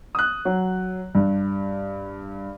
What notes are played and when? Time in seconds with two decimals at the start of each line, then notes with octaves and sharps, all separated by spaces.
0.15 D#6 F#6
0.45 F#3
1.15 G2